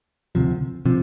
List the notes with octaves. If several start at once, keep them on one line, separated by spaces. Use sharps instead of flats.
D2 C3 F3
C3 F3